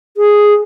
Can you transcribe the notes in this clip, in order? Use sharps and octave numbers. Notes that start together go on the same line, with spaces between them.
G#4